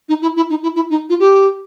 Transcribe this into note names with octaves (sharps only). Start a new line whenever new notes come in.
D#4
E4
E4
D#4
E4
E4
D#4
F4
G4